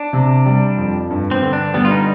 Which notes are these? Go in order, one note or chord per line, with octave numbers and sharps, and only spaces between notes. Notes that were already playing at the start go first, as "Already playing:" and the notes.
Already playing: D4
C3
G3
F2
G2
C4
D3
D4
G3 B3
F4
D#4